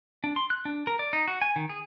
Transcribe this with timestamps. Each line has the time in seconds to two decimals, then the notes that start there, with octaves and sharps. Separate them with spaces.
0.24 D4
0.36 C6
0.50 F#6
0.65 D4
0.87 A#4
0.99 D5
1.13 D#4
1.28 F#4
1.42 G#5
1.56 D#3
1.69 G#4